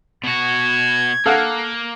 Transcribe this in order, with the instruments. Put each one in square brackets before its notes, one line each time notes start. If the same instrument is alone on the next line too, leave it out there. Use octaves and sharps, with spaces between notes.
[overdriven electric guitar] B2 F#4 [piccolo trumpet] G#6
[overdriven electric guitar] A#3 [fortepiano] A4 F5 F#5